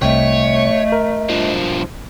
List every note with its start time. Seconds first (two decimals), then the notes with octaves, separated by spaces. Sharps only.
0.02 C2 A3 C#5 D#5 G5
0.92 A#4
1.29 G2 F3